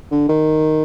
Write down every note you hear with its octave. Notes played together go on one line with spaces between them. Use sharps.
D3
D#3